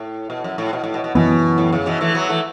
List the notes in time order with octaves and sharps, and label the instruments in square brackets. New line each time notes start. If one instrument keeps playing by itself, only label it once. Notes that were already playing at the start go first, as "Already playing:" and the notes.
Already playing: [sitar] A2
B2
F#2
A2
B2
A2
B2
B2
[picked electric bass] F#2 E3 B3 [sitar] B2
[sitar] A2
C#3
B2 E3
E3 A3
F#3 B3
E3 A3